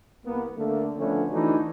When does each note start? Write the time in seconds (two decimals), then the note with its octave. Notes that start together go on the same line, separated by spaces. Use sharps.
0.25 C2 A#3 B3
0.56 D3 A3 A#3
0.98 D3 F3 A3 B3 C#4
1.31 E3 A3 D4 D#4 F#4